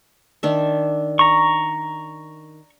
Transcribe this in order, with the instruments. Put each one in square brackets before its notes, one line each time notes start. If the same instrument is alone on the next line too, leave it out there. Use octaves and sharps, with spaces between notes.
[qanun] D#3 D4 E5
[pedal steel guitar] A#5 C#6